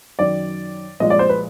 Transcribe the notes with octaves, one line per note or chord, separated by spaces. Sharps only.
F#2 D#3 F#3 D5
C2 A#2 F3 G#3 D#5
D5
C5
B4